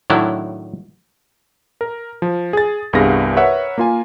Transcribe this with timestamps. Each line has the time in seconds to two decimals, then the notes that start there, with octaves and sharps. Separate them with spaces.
0.10 A2 D#3 F#3 D4 E4
1.81 A#4
2.22 F3
2.53 G#4 A6
2.93 C2 G2 B3 G#4 F5 A#6
3.36 A#4 B4 C#5 E5 F#5
3.78 A#3 F4 G#5